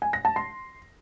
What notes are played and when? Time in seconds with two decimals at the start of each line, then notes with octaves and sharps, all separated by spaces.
0.02 G#5
0.13 A#6
0.25 A5
0.36 C6